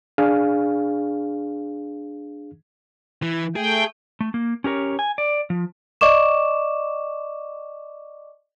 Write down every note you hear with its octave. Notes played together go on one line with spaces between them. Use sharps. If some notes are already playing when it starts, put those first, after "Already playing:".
D4 G#4 F5
E3
A3 G#4 G5
A3
A#3
C#4 G4 A#4 C#5
G#5
D5
F3
D5 D#5 C#6 D6 E7